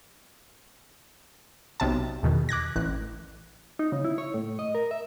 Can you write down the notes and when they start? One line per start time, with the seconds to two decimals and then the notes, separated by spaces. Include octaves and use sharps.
1.80 B1 C3 A5
2.23 E2 B2 D#3
2.49 D6 F#6 G#6 A#6
2.76 A1 F#6
3.79 D#4
3.92 C#3
4.04 E4
4.18 C#5
4.34 A2
4.59 D#5
4.75 A#4
4.91 E5